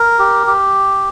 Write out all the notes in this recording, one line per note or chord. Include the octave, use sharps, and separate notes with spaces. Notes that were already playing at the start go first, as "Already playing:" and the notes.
Already playing: A#4
G4
G4